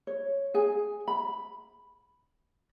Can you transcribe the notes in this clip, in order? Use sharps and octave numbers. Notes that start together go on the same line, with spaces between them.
C#5
G#4 G#5
B5